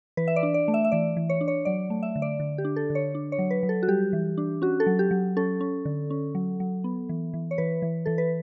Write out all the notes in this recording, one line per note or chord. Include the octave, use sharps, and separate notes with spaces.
E3 B4
E5
D5
D4
D5
A3
E5
E5
E3 D5
E3
C#5
D4
C#5
F#3 D5
A3
E5
D3
D5
D3
G4
D4
A4
D3
C#5
D4
C#5
F#3
B4
F#3
A4
F#4
G3 G4
E3
D4
C#4 F#4
A4
F#3
G4
F#3
C#4 A4
C#4
D3
C#4
F#3
F#3
B3
E3
E3
C#5
E3 B4
E3
E3 A4
B4